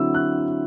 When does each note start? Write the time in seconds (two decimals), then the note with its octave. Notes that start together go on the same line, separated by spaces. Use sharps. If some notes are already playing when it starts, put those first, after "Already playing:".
Already playing: D3 F#3 C4 E4 E6
0.14 F#6